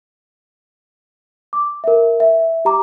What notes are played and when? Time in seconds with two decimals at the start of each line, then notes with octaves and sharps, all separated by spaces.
1.53 D6
1.84 A#4 E5
2.20 E5
2.65 G4 A#5 D6